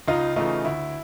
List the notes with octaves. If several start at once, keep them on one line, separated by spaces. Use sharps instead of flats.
C#2 D#4 F4
C#3 E3 A3 D#4 F4
D2 E4